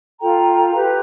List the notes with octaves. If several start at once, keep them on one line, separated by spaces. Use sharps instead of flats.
F4 A4 G5 A#5
G4 B4